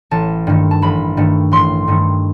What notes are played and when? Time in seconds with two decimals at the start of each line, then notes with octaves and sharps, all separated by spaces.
0.11 A1 A5
0.47 G2 D#3 A3
0.71 A5
0.82 A1 B5
1.17 G2 D#3 A3
1.51 A1 C6
1.88 G2 D#3 A3